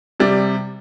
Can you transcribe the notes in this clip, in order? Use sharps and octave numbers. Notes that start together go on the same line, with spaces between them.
C3 G3 D5